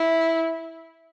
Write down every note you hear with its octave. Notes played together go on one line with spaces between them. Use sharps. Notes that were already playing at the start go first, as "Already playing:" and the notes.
Already playing: E4